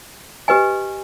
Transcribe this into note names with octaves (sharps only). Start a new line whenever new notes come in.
G4 B4 D#5 G#5